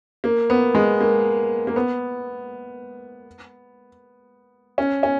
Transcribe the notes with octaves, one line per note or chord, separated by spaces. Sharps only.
A#3
B3
G#3
A#3
A#3
B3
C#4
C#4